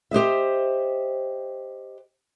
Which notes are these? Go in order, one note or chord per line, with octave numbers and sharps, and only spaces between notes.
G4 C5 D#5 E5